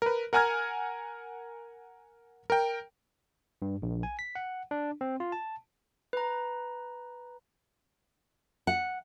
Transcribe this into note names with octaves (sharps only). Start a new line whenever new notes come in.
A#4 B4
A#4 F#5 G#5 A#5 F6 G#6
A#4 G5
G2
A#1
G#5
B6
F#5
D4
C4
F4
A5
B4 A#5
F#5